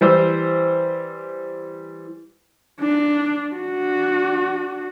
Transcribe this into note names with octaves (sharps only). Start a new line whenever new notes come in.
E3 G3 C5 E6
D4
D4 F#4